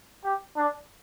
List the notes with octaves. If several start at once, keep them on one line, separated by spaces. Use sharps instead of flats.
G4
D4